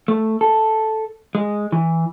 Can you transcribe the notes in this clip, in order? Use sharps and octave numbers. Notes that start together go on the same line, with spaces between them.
A3
A4
G#3
E3